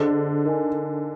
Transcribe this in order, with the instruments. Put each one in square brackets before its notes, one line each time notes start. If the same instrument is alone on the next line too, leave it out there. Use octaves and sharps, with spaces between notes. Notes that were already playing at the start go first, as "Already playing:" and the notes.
Already playing: [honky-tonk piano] D3 [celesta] G#4 C5 D#5
[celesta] D#4 A#4 D#5 G#5